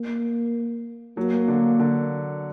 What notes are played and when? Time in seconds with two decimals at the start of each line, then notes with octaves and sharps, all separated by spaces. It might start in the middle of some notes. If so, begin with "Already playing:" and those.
Already playing: A#3
1.17 F#3 A#3
1.48 D3
1.79 D3